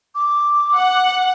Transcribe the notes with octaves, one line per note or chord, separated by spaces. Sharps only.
D6
F#5